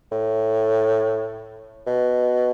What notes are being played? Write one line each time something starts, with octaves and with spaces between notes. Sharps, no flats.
A2
B2